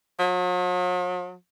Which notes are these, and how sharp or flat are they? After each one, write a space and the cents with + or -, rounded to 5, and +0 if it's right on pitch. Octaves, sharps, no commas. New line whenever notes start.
F#3 -45